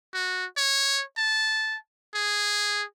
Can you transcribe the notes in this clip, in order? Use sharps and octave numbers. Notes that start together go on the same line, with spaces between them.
F#4
C#5
A5
G#4